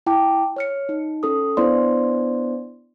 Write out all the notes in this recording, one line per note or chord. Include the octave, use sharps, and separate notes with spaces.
E4 G5 A5 D6
C#5 F6 C#7
D#4
C#4 A4 D#6
B3 D4 E4 C5 D5 C6